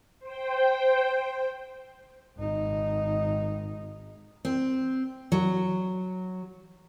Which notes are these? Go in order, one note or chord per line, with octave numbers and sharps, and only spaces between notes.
C5 G5
G#1 D#4
C4
F#3